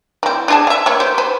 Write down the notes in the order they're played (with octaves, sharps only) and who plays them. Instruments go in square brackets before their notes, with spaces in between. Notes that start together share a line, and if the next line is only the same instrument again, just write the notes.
[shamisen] E3 C4
D4 G#4 A5
E5 F5
A#3 B3 C#5
G4 C5
B4 C5